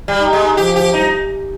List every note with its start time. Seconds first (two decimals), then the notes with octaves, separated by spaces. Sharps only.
0.08 G3
0.20 D#4
0.33 G#3
0.57 F3 G4
0.76 G4
0.94 G3 D#4